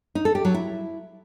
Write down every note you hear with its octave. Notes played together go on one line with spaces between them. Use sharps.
D#4
A4
G4
F#3
E4